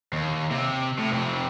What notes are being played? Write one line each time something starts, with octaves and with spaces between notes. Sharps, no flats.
D#2
C3
A2
F2 C3